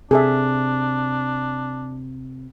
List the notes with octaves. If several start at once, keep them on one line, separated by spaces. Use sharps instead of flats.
C3 D4 G#4 A4 E5